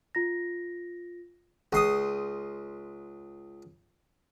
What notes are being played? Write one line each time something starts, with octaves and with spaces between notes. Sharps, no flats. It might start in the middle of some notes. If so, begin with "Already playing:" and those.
F4 A#6
C#2 C6 D#6